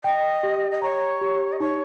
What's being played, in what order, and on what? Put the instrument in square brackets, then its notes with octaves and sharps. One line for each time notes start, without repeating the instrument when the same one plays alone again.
[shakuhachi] D#5 [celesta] G5
[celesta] G4
[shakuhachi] D#5
[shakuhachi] C#5 [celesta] A#5
[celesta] G4
[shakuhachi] D#5
[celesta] D#4 [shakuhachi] C#5